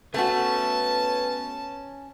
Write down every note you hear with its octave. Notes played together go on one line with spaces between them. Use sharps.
A3 B3 C#4 F#4 A5